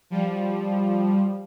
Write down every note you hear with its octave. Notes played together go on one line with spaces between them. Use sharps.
F3 G3